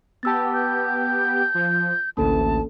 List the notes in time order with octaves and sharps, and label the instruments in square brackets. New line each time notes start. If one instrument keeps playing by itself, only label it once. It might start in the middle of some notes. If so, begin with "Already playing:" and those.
[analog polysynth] B3 G4 [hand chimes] A5 E6 A6
[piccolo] G6
[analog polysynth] F3
[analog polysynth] A1 D2 [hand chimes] A#3 C#4 A4 [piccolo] A5